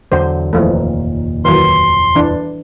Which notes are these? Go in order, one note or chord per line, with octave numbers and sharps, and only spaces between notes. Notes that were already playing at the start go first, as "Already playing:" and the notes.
E2 D3 F#3 C5
F1 D#2 A#2 E3 F3 A3
D#3 E3 F#3 C6
E3 D4